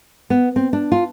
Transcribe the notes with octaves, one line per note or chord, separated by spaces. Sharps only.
B3
C4
D4
F4